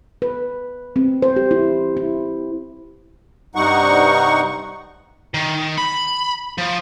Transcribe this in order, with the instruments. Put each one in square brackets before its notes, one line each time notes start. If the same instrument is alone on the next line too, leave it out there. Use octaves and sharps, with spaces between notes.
[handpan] B4
C4
C5
G4
E4
E4
[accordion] G2 C3 G3 D#4 F#5 C#6
[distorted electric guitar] D#3
B5
F3